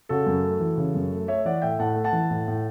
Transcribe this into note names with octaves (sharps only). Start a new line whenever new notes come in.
C#3 F#4 A4
F#2
A3
E3
C#3
F#2
A3
A3 C#5 E5
E3 D5 F#5
A2 E5 G5
A2 F#5 A5
A3
F#5 A5
E3
A2
A2